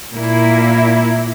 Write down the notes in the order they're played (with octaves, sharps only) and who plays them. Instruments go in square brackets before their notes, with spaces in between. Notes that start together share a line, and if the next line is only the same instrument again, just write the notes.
[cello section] A#2 A#3 E4